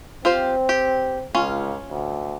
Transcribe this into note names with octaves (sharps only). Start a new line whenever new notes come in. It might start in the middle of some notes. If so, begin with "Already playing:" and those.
C4 F4 G4 C5
G4
C#2 C#4 F4
D2